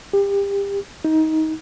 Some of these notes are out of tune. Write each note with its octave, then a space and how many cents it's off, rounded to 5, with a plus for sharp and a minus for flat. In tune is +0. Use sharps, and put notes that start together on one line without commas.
G4 +30
D#4 +20